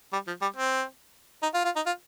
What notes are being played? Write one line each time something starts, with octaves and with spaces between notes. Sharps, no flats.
G3
F3
G3
C4
D#4
F4
F4
D#4
F4